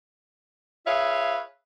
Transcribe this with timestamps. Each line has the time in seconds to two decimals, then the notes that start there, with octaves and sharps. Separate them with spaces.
0.86 F4 G#4 B4 C#5 E5 F5